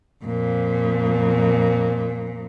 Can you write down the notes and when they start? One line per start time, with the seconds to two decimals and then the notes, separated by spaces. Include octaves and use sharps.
0.25 F2 A#2